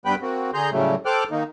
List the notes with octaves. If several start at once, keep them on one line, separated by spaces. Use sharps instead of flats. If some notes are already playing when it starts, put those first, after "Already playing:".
G2 G3 B3 B4 G5 B5
A#3 C4 F#4
D3 G#4 A#5 C6 G6
A2 C#3 F#3 G3 A3
A4 C5 G5 D6 F6 F#6
D#3 A#3 D#4